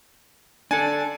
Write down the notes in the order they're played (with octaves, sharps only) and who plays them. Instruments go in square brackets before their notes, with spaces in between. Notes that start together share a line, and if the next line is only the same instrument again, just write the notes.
[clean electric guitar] D4 A4 [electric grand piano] G#5